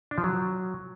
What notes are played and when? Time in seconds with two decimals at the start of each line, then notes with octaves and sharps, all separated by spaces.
0.11 D4
0.18 F3
0.24 F#3